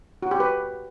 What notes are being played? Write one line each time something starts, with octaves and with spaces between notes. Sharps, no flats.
F#4
G4
B4